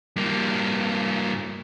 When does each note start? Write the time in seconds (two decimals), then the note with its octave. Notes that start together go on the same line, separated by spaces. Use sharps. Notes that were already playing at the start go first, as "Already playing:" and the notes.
0.16 G2 A#3